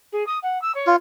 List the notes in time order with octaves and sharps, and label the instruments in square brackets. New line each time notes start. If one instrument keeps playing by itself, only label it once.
[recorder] G#4
D#6
F#5
E6
C#5
[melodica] F4